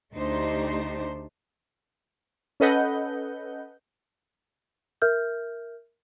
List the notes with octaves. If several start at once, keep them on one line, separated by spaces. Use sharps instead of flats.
D2 A3 D4 D#4 G4 C5
C#4 A4 B4 D#5 F#5 G6
A#4 E5 F6 G6